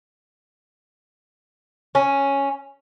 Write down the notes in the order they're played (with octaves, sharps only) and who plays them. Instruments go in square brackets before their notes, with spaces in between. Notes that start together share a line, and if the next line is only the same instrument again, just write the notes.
[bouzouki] C#4